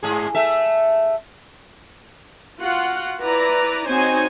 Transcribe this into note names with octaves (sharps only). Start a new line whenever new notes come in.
G#2 G#4
A3 A4 E5
F4 F#4 F#5
E4 B4 D5 A#5
C4 D#4 F#4 C5 C#5 G#5